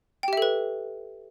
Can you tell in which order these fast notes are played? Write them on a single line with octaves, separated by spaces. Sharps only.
G5 G4 E5 A4 B4